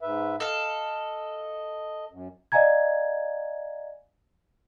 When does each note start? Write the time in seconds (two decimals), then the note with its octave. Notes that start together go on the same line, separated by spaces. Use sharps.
0.01 G#2 B4 E5
0.40 A4 D#5 F5
2.11 F#2
2.52 D5 D#5 F5 G#5 A#5 G#6